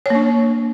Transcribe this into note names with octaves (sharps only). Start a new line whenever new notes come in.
A#3 D4 C#5